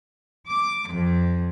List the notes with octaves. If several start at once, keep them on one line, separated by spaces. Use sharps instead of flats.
D6
F2